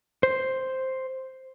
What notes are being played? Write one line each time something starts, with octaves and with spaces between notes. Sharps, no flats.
C5